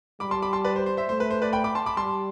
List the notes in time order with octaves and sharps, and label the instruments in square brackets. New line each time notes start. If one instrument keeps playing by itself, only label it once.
[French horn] G3 [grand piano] B5 D6
[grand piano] A5 C6
B5 D6
A5 C6
B4 D5
C5
C5
C5 E5
[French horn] A3 [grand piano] C5
[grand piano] B4
C5
B4 D5
G5 B5
B5 D6
A5 C6
B5 D6
[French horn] G3 [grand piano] A5 C6